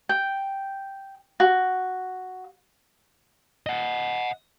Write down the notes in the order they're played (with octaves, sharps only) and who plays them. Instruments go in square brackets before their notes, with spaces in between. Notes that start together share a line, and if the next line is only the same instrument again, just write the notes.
[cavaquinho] G5
F#4
[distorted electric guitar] D#5 F#5